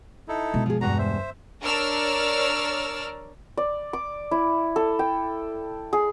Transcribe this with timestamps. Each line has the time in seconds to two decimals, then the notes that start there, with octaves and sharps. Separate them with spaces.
0.28 D#4 E4 A4
0.54 B2 G#3
0.66 F3 G#4
0.81 E2 G2 F#4 A#5
0.98 C5 E5
1.62 D4 A#4 C#5 D5 E6 F6
3.57 D5
3.93 D6
4.31 E4
4.76 A4
4.99 G5
5.93 G#4